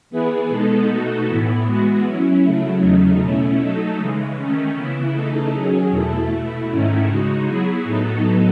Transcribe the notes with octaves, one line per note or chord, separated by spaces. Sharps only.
E3 B3 E4 G#4 B4
B2 G#3 B3 D#4 A4
B2 A3 D#4 F#4 A4
A2 E3 B3 E4
E3 G#3 B3 F#4
F#3 C#4 E4
C#3 F#3 A3 E4
E2 C#3 F#3 A3 D#4
B2 A3 C#4 E4
F#3 A3 D#4 A4
C#3 E3 G#3
D#3 A3 C#4
C#3 E3 B3 E4
C#3 E3 A3 D#4 A4
D#3 F#3 C#4 G#4
E2 B2 A3 E4 A4
B2 A3 E4
G#2 D#3 A3 C#4 E4
C#3 G#3 D#4 F#4
F#3 B3 E4 G#4
A2 F#3 B3 D#4 A4